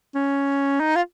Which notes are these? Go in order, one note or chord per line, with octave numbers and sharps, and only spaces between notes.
C#4
D#4
F4